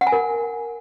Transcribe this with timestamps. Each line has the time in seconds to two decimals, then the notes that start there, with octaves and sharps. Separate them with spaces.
0.01 F#5
0.07 G#5
0.12 A#4